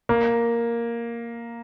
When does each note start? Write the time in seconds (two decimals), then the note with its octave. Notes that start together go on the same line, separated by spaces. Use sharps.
0.09 A#3